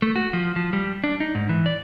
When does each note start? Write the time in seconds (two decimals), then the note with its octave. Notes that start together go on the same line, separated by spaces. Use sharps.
0.02 A3
0.16 F#4
0.33 F3
0.56 F3
0.73 G3
1.04 D4
1.20 D#4
1.35 G#2
1.49 E3
1.66 D5